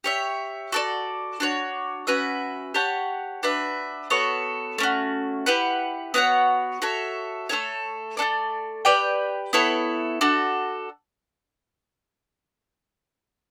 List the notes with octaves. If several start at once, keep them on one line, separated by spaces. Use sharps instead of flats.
G4 C#5 E5
F#4 A4 D5
D4 F#4 C#5
C#4 F#4 B4 E5
G4 C#5 F#5 A5
D4 F#4 B4 E5
B3 F#4 A4 C#5
A3 C#4 F#4
E4 G4 B4 F#5
B3 F#4 C#5 F#5
F#4 A4 C#5 E5
A3 E4 A4 C#5
A3 D4 A4 D5
G4 B4 D5 G5
B3 E4 A4 C#5
D4 F#4 A4